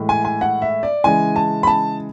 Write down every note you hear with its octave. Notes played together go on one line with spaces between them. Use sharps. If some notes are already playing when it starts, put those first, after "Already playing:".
Already playing: A2 E3 G#3
G#5
G#5
F#5
E5
D5
C#3 E3 G#3 G#5
A5
B5
A5